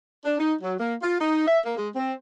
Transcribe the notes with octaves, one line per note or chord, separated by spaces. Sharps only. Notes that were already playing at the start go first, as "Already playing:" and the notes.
D4
D#4
F#3
A#3
F4
D#4
E5
A#3
G#3
C4